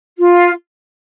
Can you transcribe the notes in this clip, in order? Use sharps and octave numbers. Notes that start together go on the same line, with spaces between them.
F4